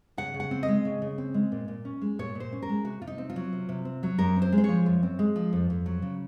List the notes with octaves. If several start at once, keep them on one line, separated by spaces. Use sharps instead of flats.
C#3 F#5
C#3
F#5
C4
D#5
G#3
C#3
C#3
C4
G#3
A#2
A#2
C#4
G#3
A#2 C#5
A#2
C5
C#4
A#4
G#3
C3 F#4
C3 F4
D#4
C4
F4
F#3
C3
C3
C4
F#3
F#2 A#4
C4
C5
G#3
C5
F3 C#5
F#2
C4
G#3
F3
F2
F2
F#3
C#3